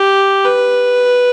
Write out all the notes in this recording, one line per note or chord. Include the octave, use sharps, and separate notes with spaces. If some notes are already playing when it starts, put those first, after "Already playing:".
Already playing: G4
B4